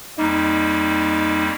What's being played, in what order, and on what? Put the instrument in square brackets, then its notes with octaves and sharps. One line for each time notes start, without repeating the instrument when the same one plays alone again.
[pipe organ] F2 G3 A#3 [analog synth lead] D#4